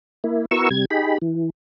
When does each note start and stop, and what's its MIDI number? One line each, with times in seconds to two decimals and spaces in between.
0.24 0.45 58
0.24 0.45 64
0.51 0.69 59
0.51 0.69 64
0.51 0.69 66
0.51 0.69 70
0.51 0.69 85
0.51 0.69 88
0.71 0.85 48
0.71 0.85 55
0.71 0.85 92
0.91 1.18 63
0.91 1.18 67
0.91 1.18 68
0.91 1.18 83
1.22 1.50 52